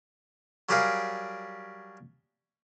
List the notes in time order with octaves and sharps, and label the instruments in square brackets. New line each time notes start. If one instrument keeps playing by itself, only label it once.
[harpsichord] F#3 G3 G4 G#4 A#4 F5